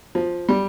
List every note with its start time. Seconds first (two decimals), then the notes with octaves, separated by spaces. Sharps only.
0.15 F3
0.49 G3